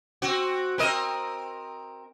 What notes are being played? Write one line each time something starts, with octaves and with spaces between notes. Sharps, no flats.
C4 F#4
C4 A#4 D#5